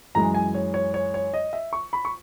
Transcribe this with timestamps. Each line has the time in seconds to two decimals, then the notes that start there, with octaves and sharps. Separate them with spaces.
0.15 F#2 E3 G#3 A#5
0.34 G#5
0.55 C#5
0.74 C#5
0.94 C#5
1.14 C#5
1.34 D#5
1.53 E5
1.73 C#6
1.93 B5
2.05 C#6